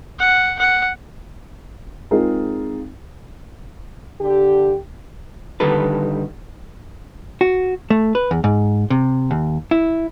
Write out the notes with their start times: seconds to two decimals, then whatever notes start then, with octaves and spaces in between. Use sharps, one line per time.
0.19 F#5
0.59 F#5
2.11 G#3 C4 D#4 F4 G#4 A#4
4.20 D3 G4
5.60 D3 D#3 G3 A4 B4
7.41 F#4
7.90 A3
8.15 B4
8.31 E2
8.44 G#2
8.90 C3
9.31 D#2
9.71 E4